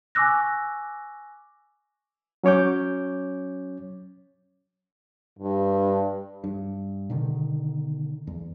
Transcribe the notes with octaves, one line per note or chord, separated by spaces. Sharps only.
G#5 C#6 D6 E6 F#6 A#6
F#3 C#4 C#5 D6 G6
G2
G2
B2 D3 D#3
E2